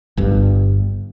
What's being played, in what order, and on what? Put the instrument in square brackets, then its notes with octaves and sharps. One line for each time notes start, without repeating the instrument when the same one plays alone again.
[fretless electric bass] G1 G2